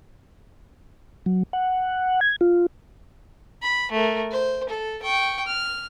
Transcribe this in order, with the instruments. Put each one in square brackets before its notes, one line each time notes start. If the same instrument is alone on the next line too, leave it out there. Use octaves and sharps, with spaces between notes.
[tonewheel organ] F#3
F#5
G#6
F4
[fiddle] B5
A3 A#4
C5
A4
G5 C#6
F6